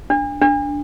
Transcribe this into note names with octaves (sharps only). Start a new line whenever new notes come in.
D4
D4